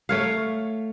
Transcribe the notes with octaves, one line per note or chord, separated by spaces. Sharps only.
A3 C#5 F5